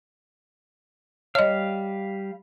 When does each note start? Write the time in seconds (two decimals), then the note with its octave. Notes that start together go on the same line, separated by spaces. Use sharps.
1.35 G3 C#5 D#5 F5